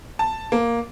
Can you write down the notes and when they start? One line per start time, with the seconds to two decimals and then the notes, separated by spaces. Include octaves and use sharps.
0.19 A5
0.52 A#3